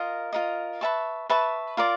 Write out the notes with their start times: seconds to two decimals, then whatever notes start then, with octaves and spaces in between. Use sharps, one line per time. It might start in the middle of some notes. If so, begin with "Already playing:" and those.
Already playing: F4 A#4 D#5
0.33 F4 A#4 D#5
0.81 B4 E5 A5 C#6
1.30 B4 E5 A5 C#6
1.77 F4 A#4 D5